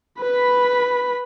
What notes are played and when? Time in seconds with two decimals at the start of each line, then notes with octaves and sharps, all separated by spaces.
0.20 B4 B5